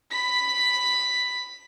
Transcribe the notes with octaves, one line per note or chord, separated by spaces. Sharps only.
B5 B6